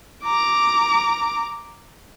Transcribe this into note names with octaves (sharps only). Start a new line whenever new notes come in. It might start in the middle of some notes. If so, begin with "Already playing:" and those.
A#5 D6